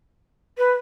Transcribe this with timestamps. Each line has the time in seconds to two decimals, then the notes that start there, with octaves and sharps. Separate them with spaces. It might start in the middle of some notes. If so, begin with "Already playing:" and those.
0.58 B4